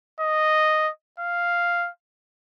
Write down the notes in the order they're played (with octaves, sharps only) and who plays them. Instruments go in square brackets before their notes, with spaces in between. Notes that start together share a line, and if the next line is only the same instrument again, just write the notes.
[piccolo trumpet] D#5
F5